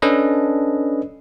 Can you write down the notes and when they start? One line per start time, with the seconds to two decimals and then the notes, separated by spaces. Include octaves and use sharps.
0.02 C#4 D4 A4 B4 D#5